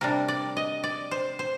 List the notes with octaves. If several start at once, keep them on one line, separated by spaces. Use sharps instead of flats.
C3 G3 D4 A#4
D5
D#5
D5
C5
C5